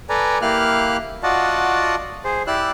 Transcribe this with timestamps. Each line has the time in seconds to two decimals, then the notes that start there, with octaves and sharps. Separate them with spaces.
0.09 A4 B4 D5 G#5 A#5
0.42 A#3 E4 G4 F5 F6 F#6
1.23 F4 F#4 D5 D#5 F#5 A5
2.25 G#4 C5
2.47 E4 G4 D5 E6 F#6